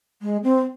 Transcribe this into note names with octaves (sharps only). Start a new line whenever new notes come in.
G#3
C4